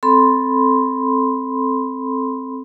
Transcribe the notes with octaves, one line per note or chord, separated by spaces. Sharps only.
C4 A4 B5 C6